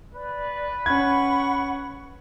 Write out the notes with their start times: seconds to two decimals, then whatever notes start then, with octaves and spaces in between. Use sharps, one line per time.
0.14 B4 D5
0.86 C#4 F#5 B5 C#6 G#6